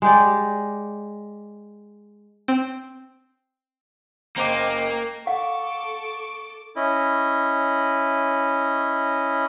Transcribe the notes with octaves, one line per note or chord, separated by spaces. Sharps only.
G#3 G4 D5
C4
F#1 A#3 C5 D#5 G5 A#5 D6
A4 F5 F#5 C#6 D6
C#4 E4 D#5